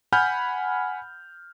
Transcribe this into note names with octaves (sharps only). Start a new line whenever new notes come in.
F#5 G#5 B5 F6 G6